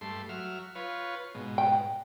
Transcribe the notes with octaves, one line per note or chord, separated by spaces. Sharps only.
G2 A3 C6
F#3 E5 F6
F4 B4 C#5
G#2 B2
G5